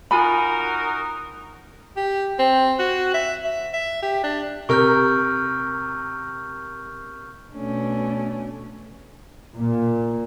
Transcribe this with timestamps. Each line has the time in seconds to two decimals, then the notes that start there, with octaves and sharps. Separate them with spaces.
0.11 D#4 F4 F#4 A#4 G#5 B5
1.96 G4
2.39 C4
2.79 F#4
3.14 E5
3.45 E5
3.73 E5
4.02 G4
4.23 D4
4.69 C3 A#4 C#6 F6 G6
7.55 B2 A3 C#4 D4
9.55 A#2